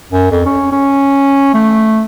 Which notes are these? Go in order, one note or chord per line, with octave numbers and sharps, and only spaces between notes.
F#2
F2
C#4
C#4
A3